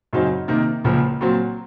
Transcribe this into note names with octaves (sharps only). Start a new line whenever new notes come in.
F#2 C#3 F#3 C4 D#4
C3 D#3 A#3 D#4
C#2 C#3 F3 A#3
A#2 F#3 C4